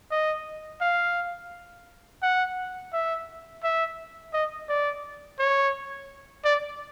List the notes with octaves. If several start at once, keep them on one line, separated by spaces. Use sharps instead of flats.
D#5
F5
F#5
E5
E5
D#5
D5
C#5
D5